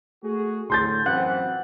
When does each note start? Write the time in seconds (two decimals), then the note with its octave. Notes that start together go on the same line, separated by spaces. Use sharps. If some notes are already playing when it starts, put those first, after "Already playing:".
0.24 A3 F#4 G#4
0.70 A2 D3 C6 G6 A6
1.06 F#2 E3 C4 F#5